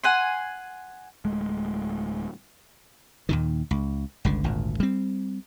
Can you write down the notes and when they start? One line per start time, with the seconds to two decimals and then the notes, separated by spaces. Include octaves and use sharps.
0.04 F#5 G#5 C6
1.25 D1 G#3 A3
3.29 D#2 A#2 D#3
3.71 C#2
4.25 G1 C#2 D3
4.44 G#1 D2 A#2
4.80 G3 C4